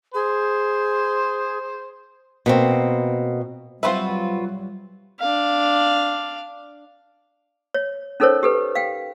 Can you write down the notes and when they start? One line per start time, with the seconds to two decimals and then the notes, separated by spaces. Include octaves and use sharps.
0.14 G#4 C5
2.46 B2 A#3 C4
3.83 F#3 G3 C4 F4 F#4 B4 C5 E5
5.20 D4 F5
7.74 C#5
8.20 C#4 D#4 A4 A#4 C5 C#5
8.43 G4 A4 B4
8.75 F5 G5